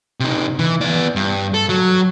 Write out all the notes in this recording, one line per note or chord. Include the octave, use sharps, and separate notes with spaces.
C3 D#4
E3
B3 D5
G2
A4
F#3